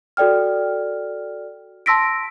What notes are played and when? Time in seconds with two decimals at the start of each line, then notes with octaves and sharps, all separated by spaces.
0.17 F#4 A4 D5 G5 F6
1.86 A5 C6 E6 A#6 B6 D7